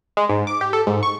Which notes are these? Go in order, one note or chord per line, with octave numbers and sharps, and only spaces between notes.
G#3
G#2
D6
G4
A4
G#2
C#6